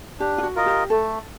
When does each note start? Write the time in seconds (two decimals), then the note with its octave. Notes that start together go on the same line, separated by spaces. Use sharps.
0.20 D4 G4
0.38 F4
0.43 F#4
0.55 F4 A#4 D#5
0.66 G4
0.90 A3 A4